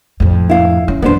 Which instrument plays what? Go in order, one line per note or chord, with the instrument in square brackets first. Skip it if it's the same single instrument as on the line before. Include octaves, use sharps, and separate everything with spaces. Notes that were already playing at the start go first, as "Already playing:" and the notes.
[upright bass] F2 A2
[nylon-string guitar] E4 F5
[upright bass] C#4
[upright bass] F#2 E3 [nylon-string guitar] B3 D4 C5